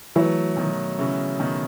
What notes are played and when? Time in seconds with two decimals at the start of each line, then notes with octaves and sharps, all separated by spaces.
0.16 E3 F#3 A3
0.57 B2 D#3
0.99 C#3 E3
1.40 B2 D#3